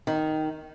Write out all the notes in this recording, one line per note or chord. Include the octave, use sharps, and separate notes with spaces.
D#3